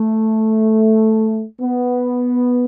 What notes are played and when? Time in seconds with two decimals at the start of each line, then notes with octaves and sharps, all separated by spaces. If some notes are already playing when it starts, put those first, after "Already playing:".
Already playing: A3
1.60 B3